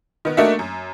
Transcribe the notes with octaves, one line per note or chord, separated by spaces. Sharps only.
D#3 B3
A3 A#3 D4 D#4 F#4 E5
F#2